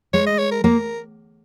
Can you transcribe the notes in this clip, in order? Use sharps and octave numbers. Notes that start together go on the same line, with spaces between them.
G#3 C#5
D#5
C#5
A#4
A#3 A#4